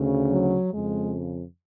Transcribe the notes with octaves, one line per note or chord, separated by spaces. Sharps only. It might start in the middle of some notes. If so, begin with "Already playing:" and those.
Already playing: D2 C#3
F#3
F2 C#3 G#3